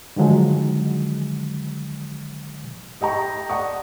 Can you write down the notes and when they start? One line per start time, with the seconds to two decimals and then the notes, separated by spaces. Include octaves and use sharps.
0.16 D3 D#3 F3 F#3 G#3
3.01 G4 D#5 G5 A#5 C#6
3.49 D5 F#5 A5 C#6 D#6